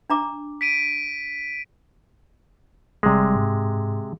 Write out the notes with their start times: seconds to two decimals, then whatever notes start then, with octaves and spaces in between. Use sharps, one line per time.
0.10 D4 A#5 D6
0.61 B6 D7 D#7
3.03 G1 C3 G3 G#3
3.35 G#2